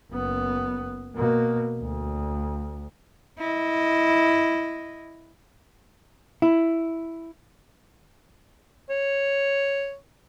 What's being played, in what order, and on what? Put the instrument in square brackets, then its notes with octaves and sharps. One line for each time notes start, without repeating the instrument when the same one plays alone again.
[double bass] F#1 B3
B2 A#3
D2
[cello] E4 D#5
[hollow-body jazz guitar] E4
[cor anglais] C#5